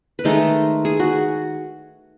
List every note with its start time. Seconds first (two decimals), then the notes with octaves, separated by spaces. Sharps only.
0.19 B4
0.24 D#3 G#3 A3 D#4 A4
0.85 G#4
1.00 F#4